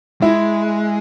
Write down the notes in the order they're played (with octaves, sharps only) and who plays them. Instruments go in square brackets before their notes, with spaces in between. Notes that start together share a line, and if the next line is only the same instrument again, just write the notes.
[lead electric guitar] G#3 [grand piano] E4